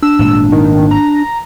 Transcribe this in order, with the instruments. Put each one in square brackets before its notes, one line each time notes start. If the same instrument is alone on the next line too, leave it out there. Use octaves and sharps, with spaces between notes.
[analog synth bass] D4 [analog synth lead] E6
[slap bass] G#1 A#2 G#3
[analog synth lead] D#3
A#5